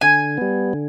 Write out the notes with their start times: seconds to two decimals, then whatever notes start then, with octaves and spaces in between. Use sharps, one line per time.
0.01 D3 G#5
0.38 G3 B3
0.73 D3